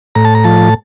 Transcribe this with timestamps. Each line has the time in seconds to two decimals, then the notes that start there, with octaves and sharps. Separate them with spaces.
0.15 A2 A#5
0.25 A5
0.35 A#5
0.44 F3 A5